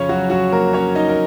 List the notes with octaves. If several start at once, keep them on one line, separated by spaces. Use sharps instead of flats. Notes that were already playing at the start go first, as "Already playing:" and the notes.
Already playing: F2 C#3 C#4 C#5
F#3 F#4
F#3 F#4
A#3 A#4
C#4 C#5
D#4 D#5
A#4